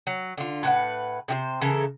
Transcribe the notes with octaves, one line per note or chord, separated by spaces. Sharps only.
F#3
D3 F4
A2 B4 F#5
C3 G4 C5
C#3 E3 A4 A#4